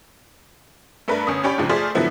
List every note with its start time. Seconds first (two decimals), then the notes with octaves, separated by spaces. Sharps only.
1.08 G2 A3 D4 A#4 B4
1.27 G1 C#4 D#6
1.44 C#4 G4 C#5 D5 G5 B5
1.58 D#2 G#2 C#3 F3
1.69 A3 F4 G#4 C5 D5 B6
1.95 A2 D3 F3 F#3 B3 E4